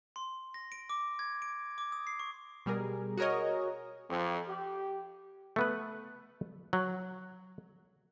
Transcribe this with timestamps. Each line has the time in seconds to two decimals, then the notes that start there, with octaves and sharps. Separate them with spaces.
0.16 C6
0.54 A#6
0.72 D7
0.90 D6
1.19 G#6
1.42 D7
1.78 D6
1.92 D#6
2.07 C7
2.20 C#6
2.66 B2 G3 G#4 A#4
3.17 F#4 G#4 A#4 C#5 D#5
4.10 F2
4.48 G4
5.56 A3 B3 B4
6.73 F#3